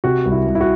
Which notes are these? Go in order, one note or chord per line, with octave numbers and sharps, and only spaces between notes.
C3 F#4
C2
E4
C2
E4
F#4